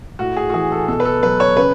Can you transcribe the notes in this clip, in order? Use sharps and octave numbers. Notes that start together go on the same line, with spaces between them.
A2 F#4
G#4
F#4
E3 G#4
A4
B2 A4
B4
A4
F#3 B4
C#5
C#3 B4